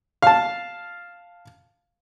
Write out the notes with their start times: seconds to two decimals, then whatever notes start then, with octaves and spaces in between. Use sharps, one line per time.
0.22 F5 A5